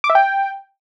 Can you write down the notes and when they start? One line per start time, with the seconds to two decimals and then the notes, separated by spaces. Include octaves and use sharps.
0.04 D6
0.10 E5
0.15 G5